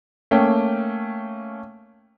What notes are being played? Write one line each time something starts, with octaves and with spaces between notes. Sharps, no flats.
A3 A#3 C#4 G5